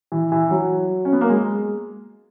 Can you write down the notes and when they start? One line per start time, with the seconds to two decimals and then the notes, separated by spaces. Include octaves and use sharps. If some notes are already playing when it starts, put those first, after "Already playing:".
0.12 E3
0.32 E3
0.51 F#3
1.05 C#4
1.13 B3
1.21 A#3
1.29 G#3